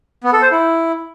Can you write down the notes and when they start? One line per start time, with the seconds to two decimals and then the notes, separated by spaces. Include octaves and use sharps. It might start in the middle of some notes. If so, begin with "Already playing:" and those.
0.24 B3
0.33 A4
0.42 C5
0.51 E4